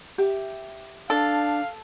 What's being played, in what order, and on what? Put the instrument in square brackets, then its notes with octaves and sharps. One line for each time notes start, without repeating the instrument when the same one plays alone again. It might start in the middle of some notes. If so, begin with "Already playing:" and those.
[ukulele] G4 E5 G5
[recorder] D4 [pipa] A4 [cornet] F5